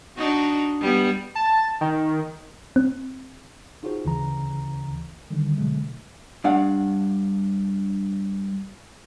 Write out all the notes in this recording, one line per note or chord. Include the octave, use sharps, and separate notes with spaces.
D4 D#4 F#4
G3 B3
A5
D#3
C4
D#4 F4 F#4 G#4 C5
D2 C#3 E3 A#5
D3 D#3 G3
B2 D3 F#3 G#3 A3
G2 D4 F5 F#5